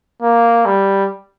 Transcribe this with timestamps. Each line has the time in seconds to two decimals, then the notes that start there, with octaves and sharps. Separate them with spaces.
0.22 A#3
0.65 G3